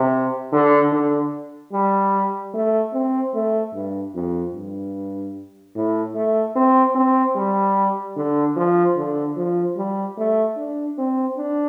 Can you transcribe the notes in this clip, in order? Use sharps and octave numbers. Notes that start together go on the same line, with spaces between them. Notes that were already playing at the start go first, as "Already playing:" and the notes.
Already playing: C3
D3
D3
G3
A3
C4
A3
G2
F2
G2
A2
A3
C4
C4
G3
D3
F3
D3
F3
G3
A3
D4
C4
D4